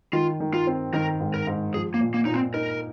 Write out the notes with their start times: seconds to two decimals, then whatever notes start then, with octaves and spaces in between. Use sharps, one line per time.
0.13 D#3 F4
0.40 D#3
0.54 F4
0.67 C4
0.93 D#3 A#4
1.20 G#2
1.34 A#4
1.47 G#2
1.74 F3 G#4
1.94 A#3
2.01 A#2
2.14 A#3
2.25 A#2 D#4
2.34 C4
2.54 D#4 A#4